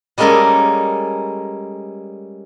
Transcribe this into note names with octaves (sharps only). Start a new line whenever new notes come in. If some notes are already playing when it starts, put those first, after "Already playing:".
G3 G#3 A#3 C#4 A4 A#4